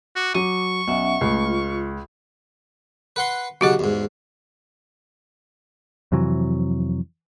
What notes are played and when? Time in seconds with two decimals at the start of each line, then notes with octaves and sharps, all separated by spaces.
0.16 F#4 D6
0.34 F#3 C#6 D#7
0.88 B1 C#4 E5 F#5
1.21 C#2 A3
1.45 F4
3.16 B4 F#5 C6
3.61 B1 C#3 F#4 G4 D#5 F#5
3.79 E2 G#2
6.12 F2 C3 E3 F#3